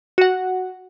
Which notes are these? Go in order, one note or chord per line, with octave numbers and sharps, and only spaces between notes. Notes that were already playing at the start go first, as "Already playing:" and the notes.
F#4 F#5